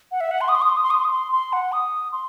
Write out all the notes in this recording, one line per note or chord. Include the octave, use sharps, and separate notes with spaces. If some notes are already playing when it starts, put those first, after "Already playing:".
F#5
E5
F#5
C6
D#6
C6
D#6
C6
D#6
C6
D#6
C6
D#6
C6
C6
F#5
D#6
C6